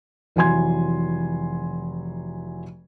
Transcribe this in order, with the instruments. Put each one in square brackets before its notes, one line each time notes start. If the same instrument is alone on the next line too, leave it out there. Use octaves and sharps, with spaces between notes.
[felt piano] F1 E3 F#3 G#5 C6 G#6